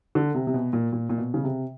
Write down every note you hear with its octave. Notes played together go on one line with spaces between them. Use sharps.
D3
C3
C3
B2
A#2
A#2
A#2
B2
C#3
C3